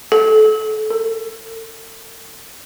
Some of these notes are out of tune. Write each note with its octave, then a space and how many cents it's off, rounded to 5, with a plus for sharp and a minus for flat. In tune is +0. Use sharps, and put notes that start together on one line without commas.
A4 -25
A4 +45